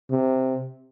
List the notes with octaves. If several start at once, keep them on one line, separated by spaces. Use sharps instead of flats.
C3